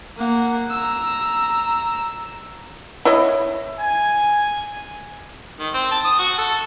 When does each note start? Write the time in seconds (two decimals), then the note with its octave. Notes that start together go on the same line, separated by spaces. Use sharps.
0.18 A#3 F#5
0.71 A#5 E6
3.05 E4 C#5 D#5
3.80 G#5
5.60 D#3
5.74 C4
5.91 A5
6.05 D#6
6.19 F#4
6.38 A4